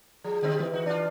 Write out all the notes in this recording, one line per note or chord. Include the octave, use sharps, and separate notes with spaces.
F3 G#4
D3 G3 C4
E3
D#4 F#4
D4 F4